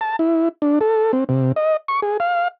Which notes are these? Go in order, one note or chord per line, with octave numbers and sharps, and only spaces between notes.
A5
E4
D4
A4
C4
C3
D#5
C#6
G#4
F5